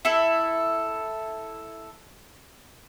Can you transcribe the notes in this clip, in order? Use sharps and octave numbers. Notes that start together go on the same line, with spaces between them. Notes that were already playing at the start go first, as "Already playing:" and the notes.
E4 A4